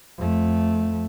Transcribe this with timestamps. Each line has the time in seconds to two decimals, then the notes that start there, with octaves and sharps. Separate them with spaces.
0.17 F2 A3